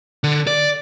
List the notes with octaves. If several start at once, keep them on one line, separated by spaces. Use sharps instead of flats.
D3
D5